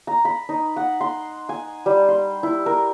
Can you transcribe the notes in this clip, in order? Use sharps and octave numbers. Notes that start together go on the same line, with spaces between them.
A#5
B5
D#4
F#5
C6
G#5
G3
C6
E4
A#4